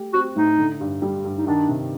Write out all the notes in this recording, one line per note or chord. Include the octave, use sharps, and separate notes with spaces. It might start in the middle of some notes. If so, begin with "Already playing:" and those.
Already playing: A3 G4
C4 F#4
A2 D#4
D3
G2
G3
G2
D#4
D#3 D4
C3